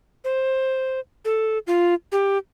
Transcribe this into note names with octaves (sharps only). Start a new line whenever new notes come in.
C5
A4
F4
G4